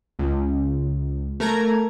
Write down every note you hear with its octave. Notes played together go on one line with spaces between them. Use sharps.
C#2
A3 A#4 A#5 G#6